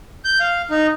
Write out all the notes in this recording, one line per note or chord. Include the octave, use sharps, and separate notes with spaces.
G6
F5
D#4